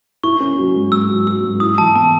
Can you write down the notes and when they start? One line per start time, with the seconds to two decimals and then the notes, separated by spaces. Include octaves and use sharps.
0.23 E4 C#6
0.40 C#4
0.58 F#3
0.75 G#2
0.92 G#2 E6
1.10 F#3
1.27 F#3 E6
1.44 G#2
1.60 E4 D#6
1.78 E3 A5
1.95 B3 A5